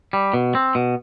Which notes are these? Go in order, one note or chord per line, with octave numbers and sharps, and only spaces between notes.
G3
B2
C4
B2